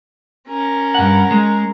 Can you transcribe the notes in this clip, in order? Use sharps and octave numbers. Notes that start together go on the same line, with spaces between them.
C#4 A#4
G2 F#5
G#3